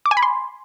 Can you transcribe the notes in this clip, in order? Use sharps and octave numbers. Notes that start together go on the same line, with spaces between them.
D6
G#5
B5
C6